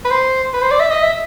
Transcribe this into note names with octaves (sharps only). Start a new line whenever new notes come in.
B4
C5
B4
C5
D5
E5
D#5
E5